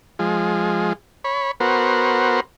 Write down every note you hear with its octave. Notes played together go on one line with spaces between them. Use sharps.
F3 G#3
C#5 B5
B3 F#4 A#4 C5